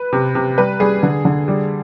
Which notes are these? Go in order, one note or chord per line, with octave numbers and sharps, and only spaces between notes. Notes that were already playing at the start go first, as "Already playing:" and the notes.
Already playing: B4
C3
C3
G3 B4
G3 G#4
D3
D3
G3